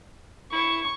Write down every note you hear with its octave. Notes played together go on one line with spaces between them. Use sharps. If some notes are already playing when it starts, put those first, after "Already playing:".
E4 C#6